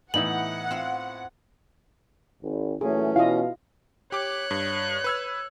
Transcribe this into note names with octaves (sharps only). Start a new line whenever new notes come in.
A2 E3 B3 D#4 E4 F#5 F#7
C4 F4 F5
G#1
A#2 E3 F#3 A3 C#4 G#4
B2 E4 F4 D#5 F5
G4 C#5 D6 F#6
G2
B4 E6 G#6